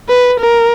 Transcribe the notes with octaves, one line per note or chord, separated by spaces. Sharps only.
B4
A#4